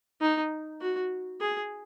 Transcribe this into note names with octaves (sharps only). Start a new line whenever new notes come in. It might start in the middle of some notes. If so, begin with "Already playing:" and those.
D#4
F#4
G#4